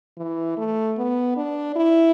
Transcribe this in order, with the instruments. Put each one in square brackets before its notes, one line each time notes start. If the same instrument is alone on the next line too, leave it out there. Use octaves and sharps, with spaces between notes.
[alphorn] E3
A3
B3
D4
E4